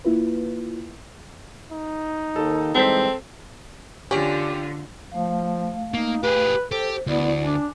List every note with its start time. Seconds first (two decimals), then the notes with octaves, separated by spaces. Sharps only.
0.04 A#3 E4 F4 B4
1.71 D#4
2.36 D#2 D#3 A4
2.75 E3 G3 G#3 C4 A4 C5 B6
4.11 D3 C#4 D4 F4 G4 G#4
5.12 F3 A3 F5
5.94 A#3 D#4
6.23 G4 G#4 B4
6.71 G4 A4 C5
7.07 D2 B3 E4 D5
7.43 D4 G#5 D6